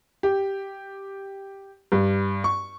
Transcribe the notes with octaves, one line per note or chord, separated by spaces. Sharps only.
G4
G2
C#6